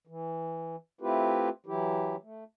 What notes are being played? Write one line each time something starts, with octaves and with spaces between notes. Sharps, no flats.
E3
A3 C4 E4 F4 G4 B4
E3 F#3 E4 G4
A3